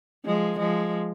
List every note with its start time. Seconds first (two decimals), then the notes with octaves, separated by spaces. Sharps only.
0.25 F3 G#3
0.58 F3 G#3